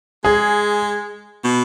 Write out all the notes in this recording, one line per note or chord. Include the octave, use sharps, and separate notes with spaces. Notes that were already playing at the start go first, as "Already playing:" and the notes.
G#3 G#4
B2